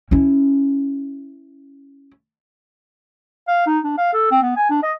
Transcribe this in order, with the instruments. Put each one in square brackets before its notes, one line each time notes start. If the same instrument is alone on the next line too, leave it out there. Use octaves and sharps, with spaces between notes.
[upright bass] C#4 E4
[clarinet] F5
D#4
D4
F5
A4
C4
B3
G#5
D4
D#5